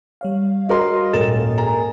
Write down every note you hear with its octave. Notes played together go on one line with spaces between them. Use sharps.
G3 C#5 F5
F#4 A#4 D#5 C6
D#1 G#2 A4 A#4 A6 E7
G#4 A#5